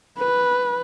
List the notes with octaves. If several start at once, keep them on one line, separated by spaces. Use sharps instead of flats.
B4